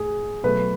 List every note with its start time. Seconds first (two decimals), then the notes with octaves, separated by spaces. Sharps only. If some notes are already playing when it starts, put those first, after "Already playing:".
Already playing: A2 G#4
0.43 B2 F#3 A3 B4